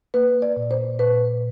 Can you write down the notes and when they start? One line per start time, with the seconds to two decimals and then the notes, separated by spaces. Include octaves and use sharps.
0.14 A#3 B4
0.42 D5
0.56 A#2
0.71 C5
0.99 A#2 B4